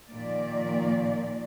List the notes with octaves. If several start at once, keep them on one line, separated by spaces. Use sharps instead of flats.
A#2 D#3 F3 A#3 D5